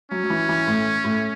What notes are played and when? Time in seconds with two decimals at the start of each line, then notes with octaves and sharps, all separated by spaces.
0.11 F#3 C#4
0.24 F#3
0.30 E3
0.49 E3
0.67 A2
1.04 A2